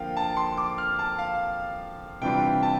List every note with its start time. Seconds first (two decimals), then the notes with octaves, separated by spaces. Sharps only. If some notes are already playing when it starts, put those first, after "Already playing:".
Already playing: D3 F3 A#3 F5 G5
0.17 A5
0.37 C6
0.57 D6
0.78 F6
0.99 A5
1.18 F5
2.21 C3 E3 G3 D4 F4 G5
2.63 A5